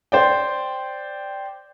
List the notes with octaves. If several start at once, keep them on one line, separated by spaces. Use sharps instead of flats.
C5 D5 G5